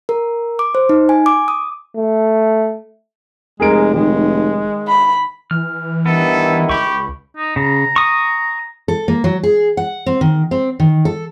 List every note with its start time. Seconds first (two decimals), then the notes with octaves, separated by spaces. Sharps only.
0.09 A#4
0.59 D6
0.75 C5
0.89 D#4
1.09 G#5
1.26 D6
1.48 D#6
1.97 A3
3.60 F1 G#3 G#4 A#4 D7
3.94 D#3 G#3
4.88 B5
5.51 E3 F6
6.06 G2 D#3 B3 E4 A4
6.69 C#2 G4 B5 C#6
7.37 D#4
7.56 C#3 A#5
7.96 C#6 D#6
8.88 A4
9.08 A#3
9.24 F#3
9.43 G#4
9.77 F#5
10.06 C4
10.21 D#3
10.51 C4
10.80 D#3
11.05 A4